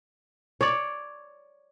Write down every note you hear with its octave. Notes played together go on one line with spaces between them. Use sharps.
C#5 D5